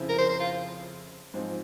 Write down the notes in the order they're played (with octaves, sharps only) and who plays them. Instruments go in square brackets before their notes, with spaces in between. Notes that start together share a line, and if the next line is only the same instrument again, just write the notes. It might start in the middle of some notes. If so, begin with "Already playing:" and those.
Already playing: [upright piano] F2 C#3 F3 C4 E4
[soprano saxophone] A#4
C5
C5
F4
[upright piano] G#2 F3 C4